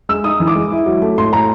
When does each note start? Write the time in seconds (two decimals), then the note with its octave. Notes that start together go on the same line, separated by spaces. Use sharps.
0.09 G#3 E6
0.24 D#4 D#6
0.40 E3
0.47 D6
0.56 G#3
0.72 E4
0.86 F#3
1.02 A3
1.18 A2 C6
1.33 A2 A#5